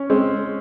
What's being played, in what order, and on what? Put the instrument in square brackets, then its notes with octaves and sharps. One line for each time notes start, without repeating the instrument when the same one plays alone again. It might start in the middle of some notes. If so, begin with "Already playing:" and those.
Already playing: [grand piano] C#4
[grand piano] G#3 [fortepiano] C4